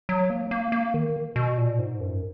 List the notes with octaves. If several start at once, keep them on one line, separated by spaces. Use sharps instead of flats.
F#3
A#3
A#3
A#3
D#3
B2
A#2
G#2
F#2